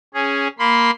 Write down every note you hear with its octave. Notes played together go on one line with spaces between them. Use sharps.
C#4 G#4
A#3 B5 C6